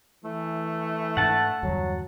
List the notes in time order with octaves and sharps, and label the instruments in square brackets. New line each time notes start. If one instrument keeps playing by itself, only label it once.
[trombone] E3 [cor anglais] A3
[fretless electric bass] G#2 D4 [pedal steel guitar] F#5 A5
[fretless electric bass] E2 G2 D3 [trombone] F#3